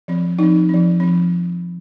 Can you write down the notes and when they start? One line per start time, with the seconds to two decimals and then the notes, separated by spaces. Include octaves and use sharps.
0.08 F3 C4
0.39 F3 C4 D#4
0.69 F3 C4
1.00 F3 C4